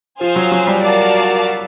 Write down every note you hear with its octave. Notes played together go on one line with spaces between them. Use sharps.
F3 G#4 C5 F5 G#5
F#3
F#3
G3
F#4 A#4 D5 F5 A5